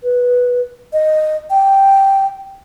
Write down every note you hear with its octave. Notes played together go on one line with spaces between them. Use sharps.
B4
D#5
G5